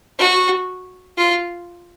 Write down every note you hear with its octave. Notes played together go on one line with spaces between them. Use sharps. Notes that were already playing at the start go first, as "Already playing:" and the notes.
F#4
F4